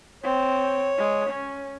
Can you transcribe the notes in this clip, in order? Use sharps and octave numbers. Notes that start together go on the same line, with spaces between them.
C4 C#5
G#3
C#4